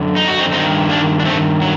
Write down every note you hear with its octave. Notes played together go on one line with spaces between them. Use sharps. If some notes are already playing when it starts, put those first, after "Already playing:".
Already playing: F#2 D3
D#4
F#4
C4 D#4
G2 D#3 C4 D#4
A#3 D4
D4
A3 C4
F#3